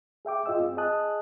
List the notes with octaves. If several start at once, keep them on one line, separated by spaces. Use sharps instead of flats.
G#4 E5 G5 D6
G2 F4 G#4 D#5 G5 E6
C4
G#4 D#5 G#5 A5 D#6 F#6